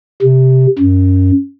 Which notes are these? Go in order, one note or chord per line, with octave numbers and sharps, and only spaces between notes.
C3
F#2